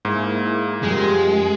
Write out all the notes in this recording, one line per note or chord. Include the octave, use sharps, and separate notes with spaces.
G#2 A#3 E4 G#4
F#2 F3 G3 G#3 A#3